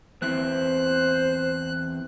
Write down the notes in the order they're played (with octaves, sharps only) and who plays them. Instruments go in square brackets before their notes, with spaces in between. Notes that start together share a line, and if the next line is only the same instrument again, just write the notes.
[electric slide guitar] E2 C4 E4 [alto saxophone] C5 [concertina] F#6